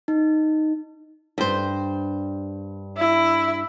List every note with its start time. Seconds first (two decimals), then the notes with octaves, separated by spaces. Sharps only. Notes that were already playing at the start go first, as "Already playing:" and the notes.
0.08 D#4
1.38 G2 C5
2.97 E4